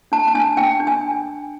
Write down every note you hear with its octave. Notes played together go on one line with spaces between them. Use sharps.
D4 A5
A5
D4 G#5
D4 G5
D4
G#5